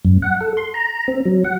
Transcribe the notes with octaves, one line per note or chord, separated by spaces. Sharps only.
F#2
F#5
A4
C6
A#5
C4
F#3
F#5